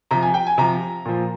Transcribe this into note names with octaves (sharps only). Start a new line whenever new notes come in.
C3 F3 A#5
G#5
G5
G#5
C3 F3 A#5
A#2 F3